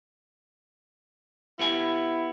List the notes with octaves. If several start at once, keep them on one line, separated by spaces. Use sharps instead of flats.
B3 E4 G4 G#5